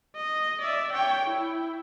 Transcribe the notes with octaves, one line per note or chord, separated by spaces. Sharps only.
D#5
D5 E5
C#5 G5
E4